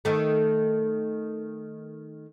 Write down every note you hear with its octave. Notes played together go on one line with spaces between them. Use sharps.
D#3 A3